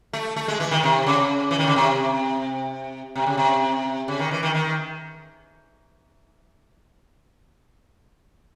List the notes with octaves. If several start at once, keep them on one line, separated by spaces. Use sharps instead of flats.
A3
A3
G#3
E3
D#3
C3
C#3
E3
D#3
C#3
C3
C3
C#3
C3
C#3
D#3
E3
D#3
D#3